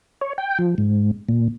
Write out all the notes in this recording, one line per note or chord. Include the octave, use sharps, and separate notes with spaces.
C#5
G5
F3
G#2
A#2